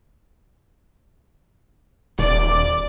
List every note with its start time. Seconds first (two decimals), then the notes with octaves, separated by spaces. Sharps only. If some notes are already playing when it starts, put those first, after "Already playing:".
2.19 D#1 D5